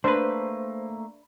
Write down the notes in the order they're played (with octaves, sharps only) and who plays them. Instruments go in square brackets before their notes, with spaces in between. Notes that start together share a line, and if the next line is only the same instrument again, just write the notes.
[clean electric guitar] A3 A#3 [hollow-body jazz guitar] D4 B4 [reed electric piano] C5